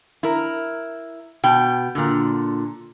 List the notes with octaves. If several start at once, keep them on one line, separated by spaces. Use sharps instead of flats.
E4 A#4
B2 G5
A#2 D3